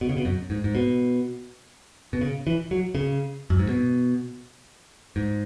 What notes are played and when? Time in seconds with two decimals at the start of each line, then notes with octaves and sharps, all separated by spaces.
0.01 B2
0.09 C#3
0.17 B2
0.25 F#2
0.50 G#2
0.64 G#2
0.75 B2
2.13 B2
2.21 C#3
2.47 E3
2.71 F#3
2.95 C#3
3.50 F#2
3.59 G#2
3.69 B2
5.16 G#2